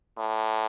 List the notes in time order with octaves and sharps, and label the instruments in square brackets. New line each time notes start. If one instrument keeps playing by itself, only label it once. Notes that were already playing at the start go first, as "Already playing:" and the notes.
[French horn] A2